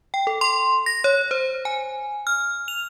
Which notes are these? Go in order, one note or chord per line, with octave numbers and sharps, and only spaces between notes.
G5
A4
C6
A#6
C#5
C5
G#5
F6
F7